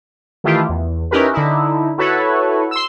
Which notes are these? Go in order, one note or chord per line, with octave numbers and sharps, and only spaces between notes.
D#3 E3 A3 E4 F4 G4
E2
C#4 D#4 E4 G4 A#4 B4
D3 D#4 E4
E4 F#4 A4 B4 C#5
C6 E6